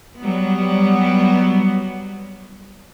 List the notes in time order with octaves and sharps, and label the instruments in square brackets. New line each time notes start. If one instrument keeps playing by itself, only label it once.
[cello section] F#3 G3 B3